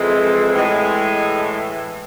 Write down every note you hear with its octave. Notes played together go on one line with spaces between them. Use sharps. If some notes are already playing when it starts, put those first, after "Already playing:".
Already playing: F2 E3 G#3
A2 E3 G#3